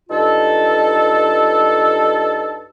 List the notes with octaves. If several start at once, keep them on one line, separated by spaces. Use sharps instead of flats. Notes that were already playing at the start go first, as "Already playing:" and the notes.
G2 D#4 F4 A4